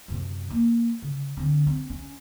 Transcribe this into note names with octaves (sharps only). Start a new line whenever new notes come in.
F#2 C3
A#3
C#3
D3 C4
C4
C#4